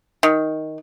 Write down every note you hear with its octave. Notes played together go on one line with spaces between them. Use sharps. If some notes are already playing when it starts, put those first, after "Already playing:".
D#3